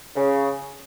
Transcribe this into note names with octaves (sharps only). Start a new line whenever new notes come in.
C#3